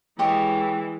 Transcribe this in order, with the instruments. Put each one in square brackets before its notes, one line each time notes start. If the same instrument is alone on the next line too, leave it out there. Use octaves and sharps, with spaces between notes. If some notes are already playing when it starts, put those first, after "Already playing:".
[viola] E3 G#3 [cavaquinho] G4 C#5 D#5